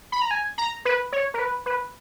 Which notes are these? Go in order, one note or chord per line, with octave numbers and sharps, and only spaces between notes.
B5
A#5
G#5
A#5
B4
C#5
A#4
B4
B4